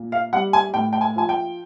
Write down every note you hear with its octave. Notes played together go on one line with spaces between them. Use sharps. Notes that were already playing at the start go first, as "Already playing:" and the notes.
Already playing: A#2
F5
G3 F#5
G#5
A2 G5
G5
G#5
F3 G#5
G5